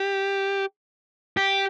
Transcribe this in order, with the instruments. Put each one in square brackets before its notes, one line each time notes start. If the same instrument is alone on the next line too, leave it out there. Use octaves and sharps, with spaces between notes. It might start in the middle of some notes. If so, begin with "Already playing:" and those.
Already playing: [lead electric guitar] G4
G4